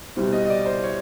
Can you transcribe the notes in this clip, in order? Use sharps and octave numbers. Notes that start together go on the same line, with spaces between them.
C2 B2 G3 C4
D#5
D#5
D5
C5
C#5